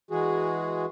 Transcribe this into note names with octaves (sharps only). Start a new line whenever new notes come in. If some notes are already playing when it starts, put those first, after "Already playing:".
E3 G#3 F#4 G#4